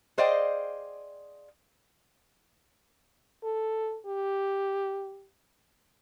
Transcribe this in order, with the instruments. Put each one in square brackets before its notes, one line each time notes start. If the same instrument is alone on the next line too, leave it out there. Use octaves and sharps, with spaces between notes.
[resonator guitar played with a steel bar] G#4 C5 D5 D#5 F5 G5
[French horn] A4
G4